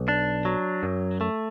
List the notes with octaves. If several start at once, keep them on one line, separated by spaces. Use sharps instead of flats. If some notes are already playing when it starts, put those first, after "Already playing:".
Already playing: B1
D4
F#3
F#2
A3